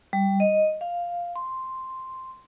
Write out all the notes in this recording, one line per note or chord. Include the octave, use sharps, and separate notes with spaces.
G3
D#5
F5
C6